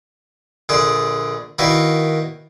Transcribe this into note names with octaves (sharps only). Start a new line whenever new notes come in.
A#1 D3 G#4 D5
D#3 A#3 E4 F#4 B4 D5